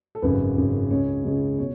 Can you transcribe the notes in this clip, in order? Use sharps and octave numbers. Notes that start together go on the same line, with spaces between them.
A4
G#1 F#2 C#3 B4
G#1 F#2 C#3
C#2 C#3 C#5
C#2 C#3
B2 C#5